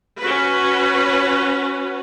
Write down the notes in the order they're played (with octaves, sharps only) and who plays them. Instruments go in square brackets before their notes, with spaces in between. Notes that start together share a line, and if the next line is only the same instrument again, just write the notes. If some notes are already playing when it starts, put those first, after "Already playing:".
[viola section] C#4 F#4 B4